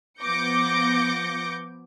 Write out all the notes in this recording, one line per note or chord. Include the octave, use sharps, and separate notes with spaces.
F3 B3 D6 G6 A#6 C#7